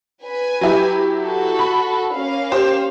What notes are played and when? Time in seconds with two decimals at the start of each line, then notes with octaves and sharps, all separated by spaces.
0.23 B4 G#5
0.61 F#3 E4 G4
1.21 F#4 A4
1.59 B5
2.14 A#3 C#4 F5
2.52 G4 C5